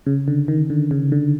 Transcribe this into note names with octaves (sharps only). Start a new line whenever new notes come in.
C#3
D3
D#3
D3
C#3
D3